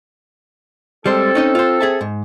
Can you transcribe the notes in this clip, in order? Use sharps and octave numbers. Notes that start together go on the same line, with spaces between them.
G3 G#3 C4 A4 C5
C#4 D#4 D#5
F4 C5
G#4 E5 A5
G#2